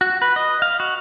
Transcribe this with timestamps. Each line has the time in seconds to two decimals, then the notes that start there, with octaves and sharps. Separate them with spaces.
0.01 F#4
0.22 B4
0.36 D#5
0.62 F5
0.80 F#4